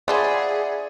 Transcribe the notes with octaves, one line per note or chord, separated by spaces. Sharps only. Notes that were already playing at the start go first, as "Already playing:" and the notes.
D4 F4 G#4 C5 D5 E5 F#5 B5